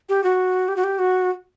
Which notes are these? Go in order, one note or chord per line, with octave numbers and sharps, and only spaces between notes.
G4
F#4
G4
F#4
G4
F#4